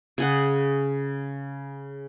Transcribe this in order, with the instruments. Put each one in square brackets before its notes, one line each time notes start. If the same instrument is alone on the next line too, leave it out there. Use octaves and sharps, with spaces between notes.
[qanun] C#3 G#4 F#5